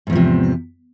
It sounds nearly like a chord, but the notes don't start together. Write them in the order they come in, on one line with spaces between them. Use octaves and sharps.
G#2 E2 F3 C3